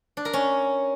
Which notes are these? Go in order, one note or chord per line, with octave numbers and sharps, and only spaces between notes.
D4
A#4
C#4